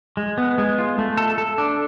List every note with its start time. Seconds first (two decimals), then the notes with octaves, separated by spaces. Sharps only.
0.17 G#3
0.38 B3
0.58 G#3
0.78 F4
0.98 A3
1.17 A4
1.38 A4
1.58 D4